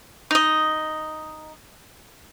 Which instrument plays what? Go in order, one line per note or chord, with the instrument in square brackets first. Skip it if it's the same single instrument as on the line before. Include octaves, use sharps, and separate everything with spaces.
[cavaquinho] D#4 D#5